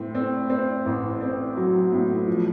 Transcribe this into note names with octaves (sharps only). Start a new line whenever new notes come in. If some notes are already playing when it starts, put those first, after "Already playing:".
Already playing: A2 C4
C4
C4
A1
C4
F#3
A2
F3